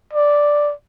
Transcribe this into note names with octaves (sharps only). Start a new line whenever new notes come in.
D5